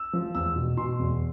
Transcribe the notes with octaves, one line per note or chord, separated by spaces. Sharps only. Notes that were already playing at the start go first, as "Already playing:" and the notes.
Already playing: E6
F3
E2 E6
B2
B2 C6
E2